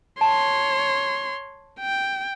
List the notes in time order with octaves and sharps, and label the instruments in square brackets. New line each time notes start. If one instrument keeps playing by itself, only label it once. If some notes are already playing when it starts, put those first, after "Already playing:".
[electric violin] C#5 C6 [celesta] A5
[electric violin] G5